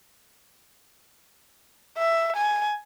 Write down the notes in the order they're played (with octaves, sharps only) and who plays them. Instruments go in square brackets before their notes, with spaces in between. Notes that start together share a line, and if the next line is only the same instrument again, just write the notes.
[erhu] E5
G#5